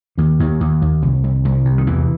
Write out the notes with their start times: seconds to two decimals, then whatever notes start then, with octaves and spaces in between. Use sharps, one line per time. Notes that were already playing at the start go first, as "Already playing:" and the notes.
0.18 D#2 D#3
0.39 D#2
0.61 D#2
0.82 D#2
1.02 C2
1.24 C2
1.45 C2
1.65 C3
1.78 D#3
1.87 E2 E3